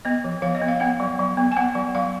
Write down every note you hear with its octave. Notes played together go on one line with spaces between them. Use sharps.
B3 D#5
F3
F3 F5
D#5
B3
F5
B3 F#5
F#3
F#3
B3
G#5
B3 F#5
F#3
F#3 F5